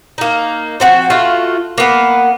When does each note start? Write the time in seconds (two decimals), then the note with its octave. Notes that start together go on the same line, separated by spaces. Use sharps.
0.18 A#3 D#4
0.80 F3 C4 F#4
1.10 A3 F4 F#4 F5
1.78 A#3 B3